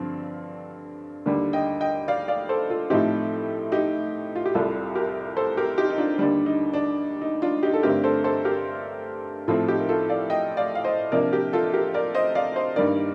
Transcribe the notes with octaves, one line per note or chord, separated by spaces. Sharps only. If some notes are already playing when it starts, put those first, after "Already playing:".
Already playing: G2 D3 F3 C4
D#2 D3 G3
D#5 G5
D#5 G5
D5 F5
D5 F5
A4 C5
F4 A4
A2 F3 A3 C4 D#4 G4
D#4 G4
F4
G4
C2 C3 G3 F4 A4
G4 A#4
A4 C5
G4 A#4
D#4 G4
D#4
D4 F4
D#2 D3 G3 D4
D#4
D4
D#4
D4 F4
D#4 G4
A4
G2 D3 A3 C4 G4 A#4
A4 C5
A4 C5
G4 A#4
A2 F3 C4 F4 A4
D#4 G4
A#4
F4 A4
D5 F5
D#5 G5
D5 F5
F5
C5 D#5
C3 F3 A#3 D4 A#4 D5
G4 A#4
F4 A4
G4 A#4
A#4 D5
C5 D#5
D5 F5
C5 D#5
G2 D#3 G3 A#3 D4 A#4 D5